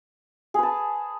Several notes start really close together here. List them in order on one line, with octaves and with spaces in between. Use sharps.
G#4 B4 A5